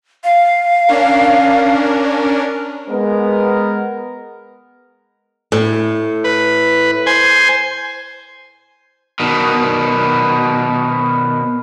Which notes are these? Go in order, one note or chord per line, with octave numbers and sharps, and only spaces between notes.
F5
C#4 D4 A#4
G#3 B3 A#4
A2
B4
C5 G#5
B2 D#3